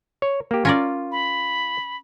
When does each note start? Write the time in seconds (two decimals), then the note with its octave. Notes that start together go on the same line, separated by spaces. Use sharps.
0.22 C#5
0.51 A#3 G4
0.65 C#4 F4 A#4 D5
1.12 B5